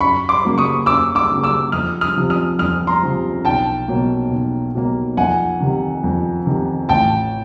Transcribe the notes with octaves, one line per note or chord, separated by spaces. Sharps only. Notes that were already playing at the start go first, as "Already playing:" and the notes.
F#2 B5 C#6
C6 D6
C#3 F#3 A#3
C#6 D#6
F#2 D6 E6
D6 E6
C#3 F#3 A#3
D6 E6
F2 D#6 F6
D#6 F6
C3 F3
D#6 F6
F2 D#6 F6
A#5 C6
C3 F3
B1 G5 A5
B2 F#3 A#3
B1
B2 F#3 A#3
F2 F#5 G#5
C3 D#3
F2
C3 D#3
A1 G5 A5